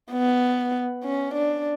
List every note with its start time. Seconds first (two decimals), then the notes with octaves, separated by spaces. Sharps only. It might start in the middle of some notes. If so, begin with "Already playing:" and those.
0.12 B3
1.04 C#4
1.34 D4